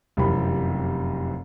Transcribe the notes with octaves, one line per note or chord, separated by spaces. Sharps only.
F1 F#2 C3 E3 G4 B5